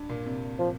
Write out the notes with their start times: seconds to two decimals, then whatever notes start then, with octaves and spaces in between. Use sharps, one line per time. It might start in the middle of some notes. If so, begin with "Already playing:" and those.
Already playing: G2
0.09 A#2
0.26 C3
0.59 F3